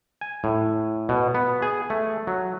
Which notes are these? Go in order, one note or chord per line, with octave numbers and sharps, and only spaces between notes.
G#5
A2
B2
B3
G#4
A3
F#3